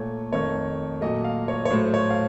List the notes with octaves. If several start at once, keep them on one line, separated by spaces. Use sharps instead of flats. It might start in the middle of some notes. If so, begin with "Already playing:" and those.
Already playing: A#2 A3 C#5
F2 D#3 A3 C#5
A#2 F#3 A3 D#5
F5
C#5
C#5
A2 F#3 A3 C5
C#5
F5